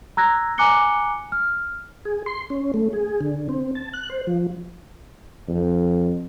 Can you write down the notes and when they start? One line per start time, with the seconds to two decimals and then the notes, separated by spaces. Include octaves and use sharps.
0.17 A#5 E6 F#6 G#6 A#6
0.58 G#5 A#5 D6 F#6 C#7 G7
1.32 F6
2.05 G#4
2.26 C6
2.50 C#4
2.74 A3
2.93 G#4
3.21 D3
3.49 C4
3.75 A5
3.93 F#6
4.10 C5
4.27 F3
5.48 F2